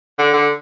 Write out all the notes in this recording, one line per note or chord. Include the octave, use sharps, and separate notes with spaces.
D3
D3